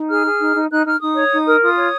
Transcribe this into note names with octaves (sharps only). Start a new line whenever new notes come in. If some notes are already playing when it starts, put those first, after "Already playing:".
Already playing: D#4
G#4 F6
G#4
D#4
D#4
D#4 F#6
D#4 F6
D#4 D#6
C#5
D#4
A#4
F4 D#6
C#5